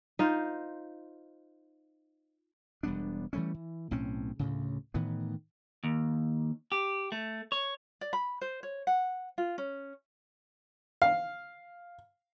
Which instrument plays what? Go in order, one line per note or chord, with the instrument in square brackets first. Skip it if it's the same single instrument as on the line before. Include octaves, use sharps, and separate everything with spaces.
[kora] D#4 F4 C5
[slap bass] E1 G3 B3 D4
E3 G3 A3 C#4
E3
B1 A2 C4 C#4
D2 A2 C#3
A2 D#3 E3 B3
[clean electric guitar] D#2
G4
A3
C#5
[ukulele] D5
B5
C5
C#5
F#5
F4
C#4
[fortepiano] F5